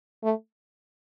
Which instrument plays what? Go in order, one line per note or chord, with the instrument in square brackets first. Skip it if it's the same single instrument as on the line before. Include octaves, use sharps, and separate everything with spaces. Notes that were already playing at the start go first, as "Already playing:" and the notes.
[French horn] A3